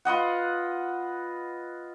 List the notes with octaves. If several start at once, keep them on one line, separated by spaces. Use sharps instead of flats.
F4 B4 D#5 F#5